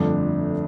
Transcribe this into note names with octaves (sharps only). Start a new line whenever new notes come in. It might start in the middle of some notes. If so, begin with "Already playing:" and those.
Already playing: G1 F2 D3 A3 D4